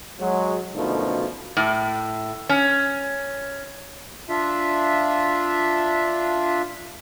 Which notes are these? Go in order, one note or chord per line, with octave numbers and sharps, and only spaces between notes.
F#3 G#3
F#2 B2 D3 F3 A3 D#4
A2
C#4
D4 F4 E5